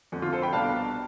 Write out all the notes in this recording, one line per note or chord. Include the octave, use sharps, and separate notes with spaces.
F2 D3 A3
F4
A4 C5
G5 B5
C2 B2 A3 D4 F5 A5